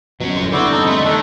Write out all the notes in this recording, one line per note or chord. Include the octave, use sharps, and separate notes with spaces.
B2 F#3 C#4
G1 F2 A2 C6
E2 G2 D3 C4 E4 F#4 D5
D#4 A4
G#3 A3
D#3 A3 D4 A4